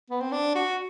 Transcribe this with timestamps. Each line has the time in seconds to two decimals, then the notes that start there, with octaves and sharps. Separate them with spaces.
0.10 B3
0.20 C4
0.32 D4
0.55 F#4